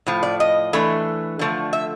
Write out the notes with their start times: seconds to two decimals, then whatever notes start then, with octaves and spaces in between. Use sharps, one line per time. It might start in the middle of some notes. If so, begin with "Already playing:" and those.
0.06 A2 F3
0.23 D5
0.40 D#5
0.73 E3 A3 D4
1.39 D3 F3 A3
1.73 E5